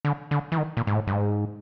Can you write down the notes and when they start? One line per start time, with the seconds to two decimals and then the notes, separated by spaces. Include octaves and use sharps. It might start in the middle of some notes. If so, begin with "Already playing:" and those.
0.05 D3
0.31 D3
0.52 E3
0.58 D#3
0.77 A#2
0.87 G#2
0.95 A2
1.07 G2
1.13 G#2